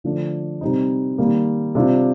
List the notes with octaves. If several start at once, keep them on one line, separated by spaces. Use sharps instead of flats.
D3 F3 A3 D4
C3 G3 C4 D#4
D#3 G3 A#3
C3 G3 D4 F4